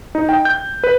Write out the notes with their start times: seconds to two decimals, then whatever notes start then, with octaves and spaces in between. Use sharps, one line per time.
0.15 D#4
0.29 G5
0.45 G6
0.84 B4